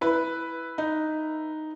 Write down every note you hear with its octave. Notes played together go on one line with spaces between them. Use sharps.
E4 B4
D#4